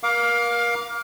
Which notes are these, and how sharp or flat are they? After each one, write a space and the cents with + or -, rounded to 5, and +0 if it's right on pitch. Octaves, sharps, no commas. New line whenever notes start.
A#4 +35 F5 +20 D6 -10